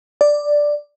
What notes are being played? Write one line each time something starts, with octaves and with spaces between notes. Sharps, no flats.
D5